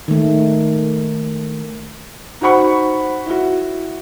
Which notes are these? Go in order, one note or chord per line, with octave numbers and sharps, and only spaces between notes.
D#3 A3
D#4 F#4 C5 F#5 B5 C#6
E4 F#4